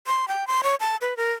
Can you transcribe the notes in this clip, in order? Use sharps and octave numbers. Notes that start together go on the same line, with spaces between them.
C6
G5
C6
C#5
A5
B4
A#4